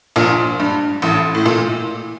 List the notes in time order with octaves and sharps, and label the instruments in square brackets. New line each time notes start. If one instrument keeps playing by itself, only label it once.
[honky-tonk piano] A#1 A#2
G2
A1 A2
A2
A#2